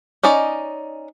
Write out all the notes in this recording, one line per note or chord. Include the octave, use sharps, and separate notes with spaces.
C#4 D#4 D5 D#5